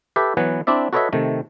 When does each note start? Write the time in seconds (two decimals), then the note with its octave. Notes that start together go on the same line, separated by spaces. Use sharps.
0.16 G4 A4 B4 E5
0.37 E3 F#3 B3 F#5 G#5
0.67 C4 D4 E4 D5 E5
0.93 F#4 A4 B4 C#5 D#5 E5
1.13 C3 D#3 A3